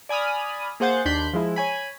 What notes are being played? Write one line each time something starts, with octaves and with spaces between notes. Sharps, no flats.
D5 G#5 B5 D#6 F6
A#3 G#4 C5 F#5 G6 A6
D#2 D4 B5 C6 G6 B6
F3 G#3 E4
C#5 G#5 B5